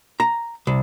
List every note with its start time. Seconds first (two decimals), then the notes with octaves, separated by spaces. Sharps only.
0.20 A#5
0.67 C2